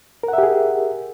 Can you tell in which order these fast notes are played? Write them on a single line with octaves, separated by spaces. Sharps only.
A#4 F#5 E5 G4 G#4